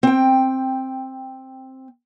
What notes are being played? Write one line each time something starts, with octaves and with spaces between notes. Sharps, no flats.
C4 G5